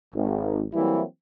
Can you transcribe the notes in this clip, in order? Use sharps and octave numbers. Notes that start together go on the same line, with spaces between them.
G#1
E3 F#3 G3 A#3 C4 E4